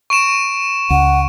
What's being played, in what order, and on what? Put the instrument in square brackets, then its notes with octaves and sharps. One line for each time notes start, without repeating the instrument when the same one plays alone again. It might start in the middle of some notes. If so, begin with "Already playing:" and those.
[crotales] C#6 D7 E7
[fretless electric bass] C#2 [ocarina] F#5